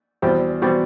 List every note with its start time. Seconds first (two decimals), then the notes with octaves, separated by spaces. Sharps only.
0.22 E2 B2 G3 C4 G4
0.62 B2 G3 C4 G4